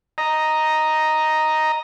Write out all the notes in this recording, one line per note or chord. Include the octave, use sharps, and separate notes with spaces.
D#5 A#5